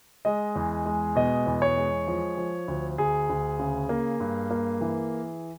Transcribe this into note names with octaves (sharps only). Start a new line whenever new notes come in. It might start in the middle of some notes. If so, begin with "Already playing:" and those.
G#3 D#5
E2
G#3
B2 D#5
E2
C#5
G#3
F3
F3
D2
D2 G#4
D2
C#3
A#3
G2
A#3
E3